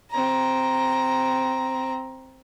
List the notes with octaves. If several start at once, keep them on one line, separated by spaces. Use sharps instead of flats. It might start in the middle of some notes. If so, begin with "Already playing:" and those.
C4 A#5